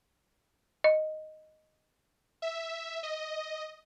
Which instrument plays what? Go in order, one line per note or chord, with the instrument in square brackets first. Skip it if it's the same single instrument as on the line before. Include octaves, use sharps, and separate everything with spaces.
[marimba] D#5
[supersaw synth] E5
D#5